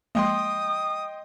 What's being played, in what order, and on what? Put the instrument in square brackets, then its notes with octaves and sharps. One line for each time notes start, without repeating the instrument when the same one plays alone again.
[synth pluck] F3 G#3 A#3 [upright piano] D#5 G5 C6 [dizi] D#6